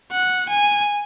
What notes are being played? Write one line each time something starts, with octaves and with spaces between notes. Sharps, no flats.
F#5
G#5